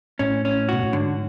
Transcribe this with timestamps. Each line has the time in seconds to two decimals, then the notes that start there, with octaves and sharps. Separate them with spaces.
0.19 A2 C#4
0.45 C#4
0.69 B2 F#4
0.83 A2
0.93 G#2 D3